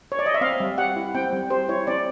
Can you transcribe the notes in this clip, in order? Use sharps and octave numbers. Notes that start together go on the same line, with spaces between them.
C#5
D5
D#5
E5
C4 F5
G3
G4 F#5
E4
C4 G5
G3
G4 C5
E4 C#5
C4 D5